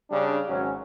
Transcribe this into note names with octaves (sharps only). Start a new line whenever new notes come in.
C#3 G3 D4
G#1 F#3 C#4